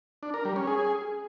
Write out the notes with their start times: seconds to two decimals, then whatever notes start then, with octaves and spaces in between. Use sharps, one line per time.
0.23 D4
0.34 A#4
0.45 G3
0.56 C#4
0.67 G#4